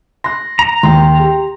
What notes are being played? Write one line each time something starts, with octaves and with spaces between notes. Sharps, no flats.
C6 F#6 A#6
A#5
D#2 G5 C6
G4